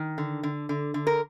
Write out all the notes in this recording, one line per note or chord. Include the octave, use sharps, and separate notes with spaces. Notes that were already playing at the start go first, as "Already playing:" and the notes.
Already playing: D#3
D3
D3
D3
D3
A#4